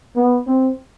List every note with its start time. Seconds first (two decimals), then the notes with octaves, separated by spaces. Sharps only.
0.16 B3
0.47 C4